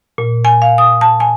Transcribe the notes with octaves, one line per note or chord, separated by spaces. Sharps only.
A#2
G#5
F5
D#6
A5
G#5